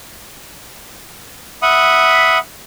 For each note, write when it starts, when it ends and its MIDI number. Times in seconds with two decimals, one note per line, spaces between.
1.62 2.38 76
1.62 2.38 78
1.62 2.38 83
1.62 2.38 87